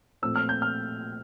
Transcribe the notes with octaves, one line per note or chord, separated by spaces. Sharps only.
A#2 F3 A3 C4 E6
F6
G6
F6